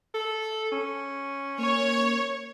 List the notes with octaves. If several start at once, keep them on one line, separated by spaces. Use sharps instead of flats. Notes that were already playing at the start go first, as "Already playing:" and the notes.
A4
C#4
A#3 C#5